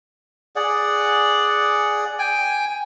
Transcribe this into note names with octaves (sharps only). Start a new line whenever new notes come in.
G#4 D5 F#5
G5 G#5